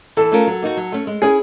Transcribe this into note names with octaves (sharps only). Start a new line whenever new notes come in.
E3 A4
A3 C#4 F4 A#4
F#3
A#3 D#4 F#4
F#3
A3 C#4
G#3
C#4 E4 G#4